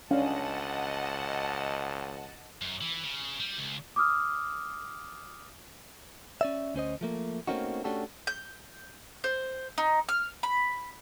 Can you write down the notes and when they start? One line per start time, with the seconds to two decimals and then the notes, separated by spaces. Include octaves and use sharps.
0.11 C#2 C#4 D4 D#5 F5 F#5 A5
2.62 F#2
2.81 E3
3.03 C#3
3.40 G3
3.58 C#2
3.96 D6 D#6 F6
6.41 C#4 D5 E5
6.74 D2 C#4 C5 D#5
7.01 F3 A3 A#3
7.48 A3 A#3 C4 C#4 D#4 F#4
7.84 A3 C#4 D4 F#4 G4 A4
8.27 G6
9.24 C5
9.78 D#4
10.09 F6
10.43 B5